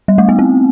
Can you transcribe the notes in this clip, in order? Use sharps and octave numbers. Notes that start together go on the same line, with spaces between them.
G3
A3
B3
C4